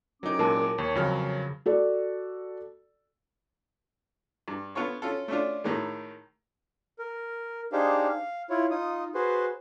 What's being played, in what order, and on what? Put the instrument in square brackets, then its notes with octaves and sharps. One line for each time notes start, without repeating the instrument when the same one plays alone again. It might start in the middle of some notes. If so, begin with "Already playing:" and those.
[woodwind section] C2 C#4 D6 [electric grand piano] F#3 D#4
[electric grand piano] A#2 F#3 G#3 [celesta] A#4 A5
[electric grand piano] D#2 [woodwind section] C#5
[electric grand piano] F2 F#3 F6 [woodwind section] C#3
[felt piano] F#4 A4 D5
[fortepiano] G2
B3 F4 A4 C#5
C#4 F4 A4
A3 C#4 D4 F4
A2 D#3 F#3 G#3
[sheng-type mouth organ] A#4
D4 D#4 G4 G#4 C5 F5
F5
E4 F4 C#5
D#4 F4 D#6
F#4 G#4 B4 C5 C6